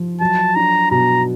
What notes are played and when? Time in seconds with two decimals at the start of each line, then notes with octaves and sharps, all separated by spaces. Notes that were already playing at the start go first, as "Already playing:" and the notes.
Already playing: F3
0.21 F#3 A5
0.56 D4 A#5
0.91 B2 A#5